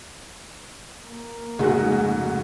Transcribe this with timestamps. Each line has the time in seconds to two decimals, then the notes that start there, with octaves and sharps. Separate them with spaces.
1.07 A#3
1.59 F1 G#2 C#3 G#3 A3 F#4